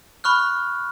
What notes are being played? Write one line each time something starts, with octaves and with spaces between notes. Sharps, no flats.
B5 C#6 F6 F#6